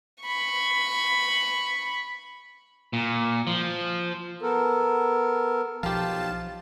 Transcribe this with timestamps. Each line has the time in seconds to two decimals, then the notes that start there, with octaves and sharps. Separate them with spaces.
0.23 B5 C#6
2.93 A#2
3.47 F3
4.42 B3 A4 A#4
5.83 B1 F3 F4 G4 F5 A5